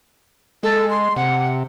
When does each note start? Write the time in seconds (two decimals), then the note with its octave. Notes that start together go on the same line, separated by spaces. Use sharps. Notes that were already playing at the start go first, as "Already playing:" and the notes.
0.63 G#3 A4
0.90 C6
1.16 C3 F#5